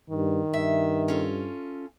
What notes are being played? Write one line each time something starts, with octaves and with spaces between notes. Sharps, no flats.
G2 D#3
G2 E5
C#4 F4 A4